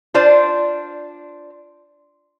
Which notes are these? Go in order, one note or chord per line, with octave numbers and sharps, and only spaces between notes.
D4 F4 C5 D5